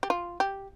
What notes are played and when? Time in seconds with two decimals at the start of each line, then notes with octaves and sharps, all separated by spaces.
0.03 G4
0.10 F4
0.40 G4